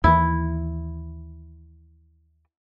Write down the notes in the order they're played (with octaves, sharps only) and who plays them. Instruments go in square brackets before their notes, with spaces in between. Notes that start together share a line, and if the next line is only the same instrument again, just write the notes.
[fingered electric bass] D#2 E3 [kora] E4